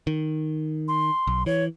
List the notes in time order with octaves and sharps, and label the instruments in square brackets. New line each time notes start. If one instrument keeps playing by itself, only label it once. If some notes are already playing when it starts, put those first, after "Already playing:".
[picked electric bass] D#3
[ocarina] C6
[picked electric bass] B1
[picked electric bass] E3 [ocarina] C#5